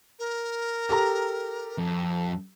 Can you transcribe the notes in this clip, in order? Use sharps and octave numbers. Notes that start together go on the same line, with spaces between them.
A#4
G4 A4 A#5
F2